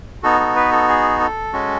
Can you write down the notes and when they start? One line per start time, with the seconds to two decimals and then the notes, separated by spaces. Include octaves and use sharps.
0.23 B3 D#4 F#4 A4
0.40 A4
0.56 B4
0.72 A4
0.88 G#4
1.21 A4
1.53 G#3 C#4 F#4